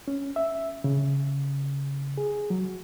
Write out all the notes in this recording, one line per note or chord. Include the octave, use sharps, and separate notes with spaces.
C#4
E5
C#3
G#4
F#3